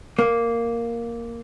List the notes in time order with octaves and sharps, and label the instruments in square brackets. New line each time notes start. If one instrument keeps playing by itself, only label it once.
[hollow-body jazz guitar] A#3